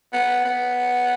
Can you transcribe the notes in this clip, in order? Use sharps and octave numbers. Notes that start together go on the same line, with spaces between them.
B3
B3